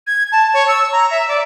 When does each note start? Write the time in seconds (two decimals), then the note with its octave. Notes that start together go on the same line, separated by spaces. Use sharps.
0.07 G#6
0.32 A5
0.54 C#5
0.68 E6
0.92 A#5
1.11 E5
1.28 D5